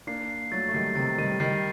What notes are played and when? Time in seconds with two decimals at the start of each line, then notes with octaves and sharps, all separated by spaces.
0.07 A#3 D4 C7
0.29 C7
0.51 F#3 A3 A6
0.69 A3
0.73 D#3 G3 C7
0.95 C3 D#3 A6
1.18 D#3 G3 D#7
1.40 D#3 G3 C7